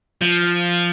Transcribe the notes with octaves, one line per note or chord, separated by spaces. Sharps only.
F3